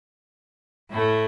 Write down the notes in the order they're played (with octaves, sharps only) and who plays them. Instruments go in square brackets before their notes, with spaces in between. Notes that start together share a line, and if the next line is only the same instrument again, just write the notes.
[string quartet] A2 A3 E4